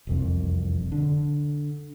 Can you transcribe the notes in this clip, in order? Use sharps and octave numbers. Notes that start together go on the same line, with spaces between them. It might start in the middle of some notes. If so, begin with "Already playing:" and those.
E1 C2 F2
D3